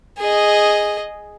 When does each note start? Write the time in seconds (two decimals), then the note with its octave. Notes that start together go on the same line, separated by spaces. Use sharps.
0.19 G#4 D#5